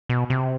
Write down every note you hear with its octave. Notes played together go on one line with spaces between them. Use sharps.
B2
C3